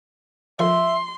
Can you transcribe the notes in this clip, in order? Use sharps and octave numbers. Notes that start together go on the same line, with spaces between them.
D#3 F3 A4 E5 C6